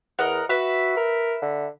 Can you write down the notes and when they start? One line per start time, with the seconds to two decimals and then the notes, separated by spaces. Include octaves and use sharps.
0.19 E2 A#4 D#5 F#5
0.49 F#4 B4 E5
0.97 A#4
1.42 D3